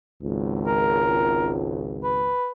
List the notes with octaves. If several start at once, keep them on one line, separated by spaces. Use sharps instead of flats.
G#1 C#2
A#4
B4